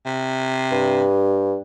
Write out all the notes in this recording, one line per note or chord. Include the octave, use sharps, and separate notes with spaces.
C3
G2